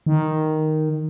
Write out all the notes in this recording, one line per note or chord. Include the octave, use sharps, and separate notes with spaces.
D#3